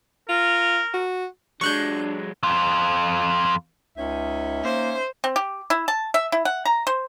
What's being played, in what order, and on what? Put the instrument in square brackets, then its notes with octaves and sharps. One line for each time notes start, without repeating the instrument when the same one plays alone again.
[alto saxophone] F4 [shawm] A#4
[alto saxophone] F#4
[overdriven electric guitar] F#3 G#3 [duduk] D4 [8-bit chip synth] C#6 F#6 G6
[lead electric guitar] F2 F4
[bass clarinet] C#2 [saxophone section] C#4 D#4 [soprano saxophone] E5
[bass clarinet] A#3 [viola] C5
[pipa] C4
G4
E4
A5
E5
E4
F#5
A#5
C5